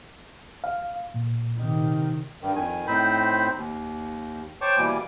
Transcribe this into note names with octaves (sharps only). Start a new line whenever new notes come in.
F5
A#2
C3 D#3
G2 D#3
F2 D#3 G#5
A2 C4 D#4 C5 B5
D#2
C5 C#5 G5 A5 C#6 D6
B2 E3 G3 A#3 G#5 D6